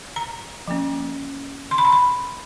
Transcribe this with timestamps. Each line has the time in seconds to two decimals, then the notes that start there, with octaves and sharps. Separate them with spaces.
0.16 A#5
0.67 F3 A#3 C#4
1.71 C6
1.78 B5
1.85 A#5
1.92 B5